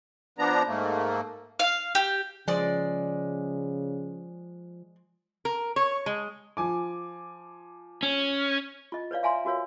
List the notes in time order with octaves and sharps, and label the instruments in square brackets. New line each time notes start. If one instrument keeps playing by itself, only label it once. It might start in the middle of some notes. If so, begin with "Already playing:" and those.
[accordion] F3 B3 D4 A#5
G#2 A3 A#3
[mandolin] F5
G4
[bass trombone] C#3 [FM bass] F3 [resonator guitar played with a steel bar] G#3 D5
[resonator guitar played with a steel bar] A#4
C#5
G#3
[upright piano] F3 G#5 D6
[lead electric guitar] C#4
[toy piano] F4 D#5
B4 C#5 D5 F5
E5 F5 G#5 A#5 C6
F4 F#4 A#4 C#5 F5